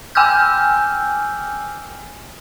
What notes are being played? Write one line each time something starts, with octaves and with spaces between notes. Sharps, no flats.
G5 G#5 D6 E6 F6 G6